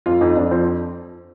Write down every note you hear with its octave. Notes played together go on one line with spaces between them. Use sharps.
F2 F4
F2 D#4
F2 D4
F3 C4